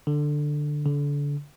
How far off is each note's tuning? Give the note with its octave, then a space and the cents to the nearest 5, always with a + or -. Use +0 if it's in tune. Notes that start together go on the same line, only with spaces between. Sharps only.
D3 +10
D3 -30